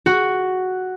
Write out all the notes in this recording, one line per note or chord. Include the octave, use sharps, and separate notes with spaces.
F#4